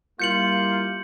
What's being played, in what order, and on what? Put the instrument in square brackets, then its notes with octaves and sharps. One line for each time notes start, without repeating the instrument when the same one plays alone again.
[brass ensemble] G3 A#3 E4 [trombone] F4 [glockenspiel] G6 C#7 F#7